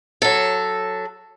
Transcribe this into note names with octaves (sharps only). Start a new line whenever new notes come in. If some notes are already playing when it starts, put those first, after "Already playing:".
F#3 A4